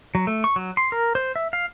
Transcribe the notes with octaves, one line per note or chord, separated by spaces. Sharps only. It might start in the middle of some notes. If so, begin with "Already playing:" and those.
F#3
A3
C#6
F#3
C6
A#4
C5
E5
F5